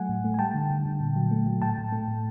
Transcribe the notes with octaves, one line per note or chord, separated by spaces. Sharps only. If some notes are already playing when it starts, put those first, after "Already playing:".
Already playing: F#3 A3 F#5 G#5
A2
A3
G#5
G3 G5 A5
D3
D3
D3
A#2
F#3
A3
F#3
A2 G5 A5
A2
A3
A2